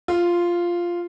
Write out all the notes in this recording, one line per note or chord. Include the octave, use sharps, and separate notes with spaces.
F4